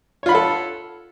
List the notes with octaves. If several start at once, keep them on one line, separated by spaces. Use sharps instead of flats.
F4 A4 C#5 F#5 B5